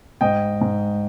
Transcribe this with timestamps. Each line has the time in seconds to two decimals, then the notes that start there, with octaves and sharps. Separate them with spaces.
0.21 G#2 D#5 G5
0.61 G#2